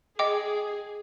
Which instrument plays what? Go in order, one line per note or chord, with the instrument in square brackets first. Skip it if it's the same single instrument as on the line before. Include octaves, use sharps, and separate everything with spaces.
[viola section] G#4 [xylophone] D#5 G5 D6